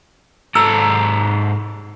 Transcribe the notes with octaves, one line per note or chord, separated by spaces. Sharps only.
G#2 A4 A#5 E6